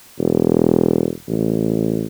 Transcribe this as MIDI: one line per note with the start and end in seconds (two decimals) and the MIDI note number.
0.19 1.11 28
1.28 2.06 33